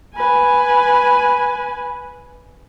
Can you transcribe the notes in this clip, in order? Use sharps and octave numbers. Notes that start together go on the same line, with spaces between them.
B4 G#5